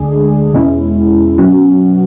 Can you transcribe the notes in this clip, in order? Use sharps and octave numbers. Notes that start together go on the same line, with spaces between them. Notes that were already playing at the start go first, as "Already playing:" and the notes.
Already playing: D2 D3 G#3 D4 G#4
E2 B2 G#3 C#4 E4
B2 F#3 C#4 F#4